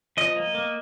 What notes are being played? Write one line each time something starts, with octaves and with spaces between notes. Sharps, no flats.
F3 D#5
A#3
A#3